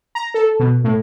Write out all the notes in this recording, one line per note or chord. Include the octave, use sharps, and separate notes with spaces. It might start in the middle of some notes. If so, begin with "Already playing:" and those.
A#5
A4
B2
A2